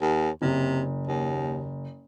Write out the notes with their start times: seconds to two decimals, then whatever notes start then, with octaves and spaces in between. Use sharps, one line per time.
0.01 D#2
0.42 F#1 C3
1.07 D#2